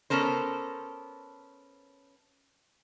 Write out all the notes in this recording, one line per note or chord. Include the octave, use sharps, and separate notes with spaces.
B3 C#4 A4 A#4 C5